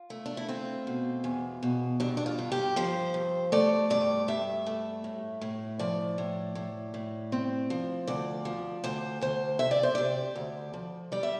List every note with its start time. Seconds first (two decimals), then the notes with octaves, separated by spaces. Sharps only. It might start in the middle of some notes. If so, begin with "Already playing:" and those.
Already playing: F4
0.10 A3
0.26 D4
0.37 E4
0.48 C4 F4
0.87 B2
1.24 E2
1.63 B2
2.00 G2 D4
2.17 D4
2.26 F4
2.38 G2
2.52 G4
2.76 F3 C5
3.14 G2
3.52 A3 D5
3.90 G2 D5
4.28 G2 E5
4.66 A3
5.04 A2
5.41 A2
5.79 F3 D5
6.18 A2
6.55 A2
6.94 A2
7.32 C4
7.70 F3
8.07 D2 D5
8.45 F3
8.84 D2 C5
9.21 D2 C5
9.59 C3 E5
9.71 D5
9.83 C5
9.95 C3 D5
10.35 D2
10.74 F3
11.12 G3 D5
11.23 E5